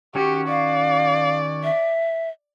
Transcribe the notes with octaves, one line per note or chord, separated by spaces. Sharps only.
D#3 C#4 F#4 G4
D5 F5
E5